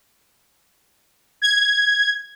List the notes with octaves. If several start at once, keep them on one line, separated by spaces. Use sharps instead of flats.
G#6